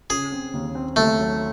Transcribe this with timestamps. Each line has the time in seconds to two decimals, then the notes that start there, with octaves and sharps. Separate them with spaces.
0.10 C#3 G#4
0.32 C4
0.53 D#2
0.75 C4
0.96 D#2 A3
1.19 F#3